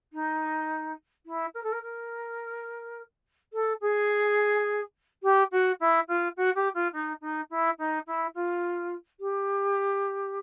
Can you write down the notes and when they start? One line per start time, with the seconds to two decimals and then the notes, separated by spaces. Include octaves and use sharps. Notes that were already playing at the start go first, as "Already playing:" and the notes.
0.12 D#4
1.26 E4
1.54 A#4
1.63 A4
1.72 A#4
1.82 A#4
3.53 A4
3.81 G#4
5.23 G4
5.51 F#4
5.80 E4
6.08 F4
6.36 F#4
6.55 G4
6.74 F4
6.93 D#4
7.21 D#4
7.50 E4
7.78 D#4
8.07 E4
8.34 F4
9.20 G4